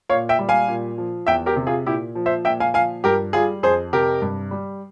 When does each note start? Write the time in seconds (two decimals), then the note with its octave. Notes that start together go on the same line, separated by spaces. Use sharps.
0.09 A#2 C#5 F5
0.29 E5 G5
0.39 G3
0.49 F5 G#5
0.68 A#2
0.98 F3
1.27 E2 E5 G5
1.46 G4 A#4
1.56 C3
1.67 F4 G#4
1.86 A#2 E4 G4
2.15 F3
2.26 C5 E5
2.45 A#2 E5 G5
2.60 F5 G#5
2.74 F3 F5 G#5
3.04 G2 G4 A#4
3.33 G3 F4 G#4
3.63 F2 G#4 C5
3.93 C3 G4 A#4
4.22 G2
4.51 G3